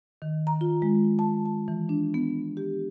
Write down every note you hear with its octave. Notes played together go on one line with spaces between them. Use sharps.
D#3
A#5
F4
G#3
A5
A5
E3
D4
B3
G4